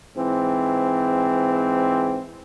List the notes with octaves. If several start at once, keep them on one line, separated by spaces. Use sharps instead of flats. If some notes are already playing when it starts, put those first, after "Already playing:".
G#2 E3 C4